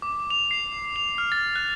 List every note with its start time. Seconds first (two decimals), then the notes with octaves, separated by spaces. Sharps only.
0.02 D6
0.30 F7
0.51 C7
0.96 F7
1.18 F6
1.32 A6
1.56 F#6